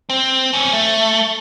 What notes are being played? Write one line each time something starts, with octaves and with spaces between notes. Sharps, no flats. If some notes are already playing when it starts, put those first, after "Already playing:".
C4
C4 C#4
A3